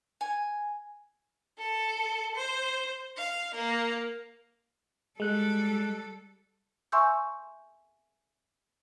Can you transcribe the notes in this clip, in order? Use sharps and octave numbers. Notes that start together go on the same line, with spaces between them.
G#5
A4
C5
F5
A#3
G3 G#3 A4 F#6
E5 G#5 C6 C#6 E6 G6